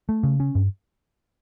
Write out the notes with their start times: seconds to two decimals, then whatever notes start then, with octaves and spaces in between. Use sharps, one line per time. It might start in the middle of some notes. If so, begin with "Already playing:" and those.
0.09 A3
0.23 C#3
0.40 C#4
0.55 G2